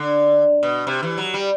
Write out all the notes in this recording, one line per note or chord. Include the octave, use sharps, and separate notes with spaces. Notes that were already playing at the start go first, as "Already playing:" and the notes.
Already playing: D3
B2
C3
E3
F#3
G3